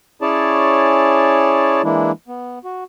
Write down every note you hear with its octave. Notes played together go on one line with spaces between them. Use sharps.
C#4 E4 G#4 C#5 D5 A5
E3 G#3 A#3 D4 E4
B3
F#4